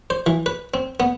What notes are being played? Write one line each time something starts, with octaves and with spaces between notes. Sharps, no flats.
C5
E3
B4
C4
B3